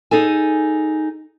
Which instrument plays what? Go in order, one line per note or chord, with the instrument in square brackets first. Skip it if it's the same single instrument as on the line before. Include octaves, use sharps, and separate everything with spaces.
[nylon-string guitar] D#4 G#4 A4 G#5